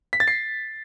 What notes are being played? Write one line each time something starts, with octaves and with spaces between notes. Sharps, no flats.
B6
A6
C7